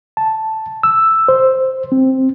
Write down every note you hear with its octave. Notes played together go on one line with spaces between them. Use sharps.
A5
E6
C5
C4